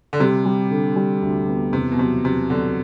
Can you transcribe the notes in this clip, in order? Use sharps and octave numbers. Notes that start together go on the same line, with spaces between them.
D3
C3 G3
G3
D3
G3
D2
B3
E2 C3
B2
C3 F#3
C3 F#3
B2 D3 F#3